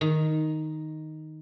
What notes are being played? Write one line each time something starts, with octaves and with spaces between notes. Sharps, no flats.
D#3